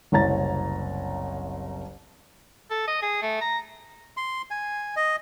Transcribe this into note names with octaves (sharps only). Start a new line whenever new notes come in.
F#1 C2 C#5 A#5 A6
A4
D#5
G#4
A3
A#5
C6
G#5
D#5